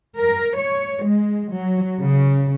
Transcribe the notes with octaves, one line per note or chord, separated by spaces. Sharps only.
A#4
C#5
G#3
F#3
C#3